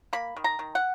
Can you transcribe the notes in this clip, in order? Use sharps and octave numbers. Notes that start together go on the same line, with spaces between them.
A#3 B5
D#3
A#5
D#3
F#5